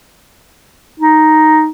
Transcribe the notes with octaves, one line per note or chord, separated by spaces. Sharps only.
D#4